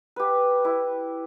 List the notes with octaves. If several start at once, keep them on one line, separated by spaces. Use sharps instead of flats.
G4 B4
E4